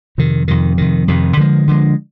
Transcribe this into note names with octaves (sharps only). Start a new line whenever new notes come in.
F2 C3 D#3
F2 C3 D#3
F2 C3 D#3
F2 C3 D#3
D3 F3 G#3
D3 F3 G#3